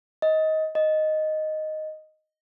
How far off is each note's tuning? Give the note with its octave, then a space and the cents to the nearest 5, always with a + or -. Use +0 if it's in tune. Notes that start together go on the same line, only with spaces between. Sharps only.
D#5 +20
D#5 +0